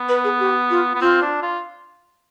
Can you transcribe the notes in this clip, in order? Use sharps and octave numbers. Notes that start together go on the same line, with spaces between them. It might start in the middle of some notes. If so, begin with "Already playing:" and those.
Already playing: B3
B4
G#4
G4
F4
B3
C4 F4
D4
F4